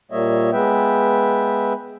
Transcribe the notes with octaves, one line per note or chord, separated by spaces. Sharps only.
A#2 G3 A#3 C#5 D#5 E5
G#3 B3 B4 E5 G5